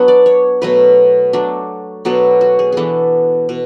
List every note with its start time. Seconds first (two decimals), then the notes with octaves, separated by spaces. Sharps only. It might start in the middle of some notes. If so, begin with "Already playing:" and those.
Already playing: F#3 B3 D4 F#5
0.08 D5
0.26 C#5
0.62 B2 F#3 A3 B4
1.33 F#3 A3 D4
2.05 B2 F#3 B3 D4 A4
2.41 F#4
2.59 G#4
2.72 E3 B3 D4 G#4 A4
3.49 B2